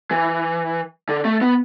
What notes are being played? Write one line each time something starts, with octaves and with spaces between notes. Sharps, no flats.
E3
D3
A3
B3